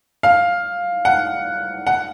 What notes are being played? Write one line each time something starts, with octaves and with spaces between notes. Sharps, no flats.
F5
F#5
F#5